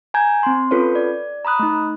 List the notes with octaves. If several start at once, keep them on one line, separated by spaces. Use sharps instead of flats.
G#5 A#5 G6 G#6
C4 C6
C#4 F4 A4 B4 C#5
D5
A#5 B5 D#6 F#6
A3 D#4